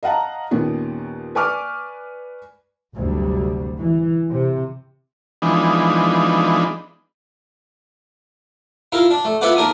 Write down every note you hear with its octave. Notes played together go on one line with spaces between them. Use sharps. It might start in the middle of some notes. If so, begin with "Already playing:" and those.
D#5 F5 F#5 A5 A#5
D#2 A#2 D#3 B3 C#4
B4 D5 G#5 C#6 D6 F6
G1 D2 C3 F#3 G3
E3
C3
E3 F3 G#3 B3 D4 D#4
E4 F4 A#4
D4
A3
B3 E4 F4 B4 D5 F#5
D#2 D4 A#4 G#5 D#6